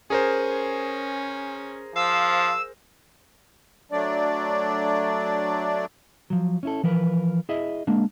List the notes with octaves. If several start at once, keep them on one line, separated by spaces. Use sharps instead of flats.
C#4 G#4 A#4 C5
F3 F5 E6
F#3 A3 D4 D5
F3 F#3
C#4 E4 A4
E3 F3 A#4 B4
E4 G#4 D#5 E5
G#3 A#3 D4